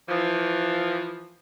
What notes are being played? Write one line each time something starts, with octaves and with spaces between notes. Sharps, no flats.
E3 F3